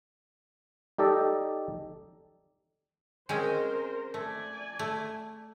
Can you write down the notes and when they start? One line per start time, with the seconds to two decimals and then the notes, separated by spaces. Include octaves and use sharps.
0.98 D#4 G4 A4 D5 D#5
3.29 G#3 C4 C#4 A#4 C5
4.14 A3 D5 G#5
4.79 A3